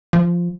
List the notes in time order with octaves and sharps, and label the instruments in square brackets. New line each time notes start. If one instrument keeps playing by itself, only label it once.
[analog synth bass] F3